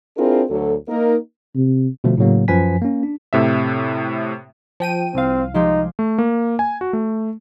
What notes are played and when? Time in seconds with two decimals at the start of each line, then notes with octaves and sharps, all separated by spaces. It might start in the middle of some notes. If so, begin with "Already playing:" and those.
0.17 C4 D4 E4 F4 G#4 A#4
0.49 D2 D3 F#3 A4
0.89 A#3 D#4 A#4
1.55 C3
2.04 B2 D3 F3 A3
2.17 A2 C#3 F#3 A#3
2.48 F#2 F3 B4 G#5 B6
2.82 A#3 C#4
3.03 D4
3.33 A2 C3 E5
4.80 F3 G5 D#7
5.15 C2 C4 F5
5.54 F3 G#3 D#4 G4
5.99 A3
6.18 A#3
6.59 G#5
6.81 F#4
6.93 A3